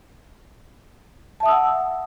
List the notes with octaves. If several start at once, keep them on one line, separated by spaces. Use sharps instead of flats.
E5 F#5 A5 D#6 E6